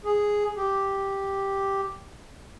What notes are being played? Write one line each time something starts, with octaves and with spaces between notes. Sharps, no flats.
G#4
G4